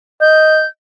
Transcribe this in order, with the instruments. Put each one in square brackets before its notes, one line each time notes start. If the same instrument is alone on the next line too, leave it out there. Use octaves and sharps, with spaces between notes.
[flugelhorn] D#5 [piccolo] G6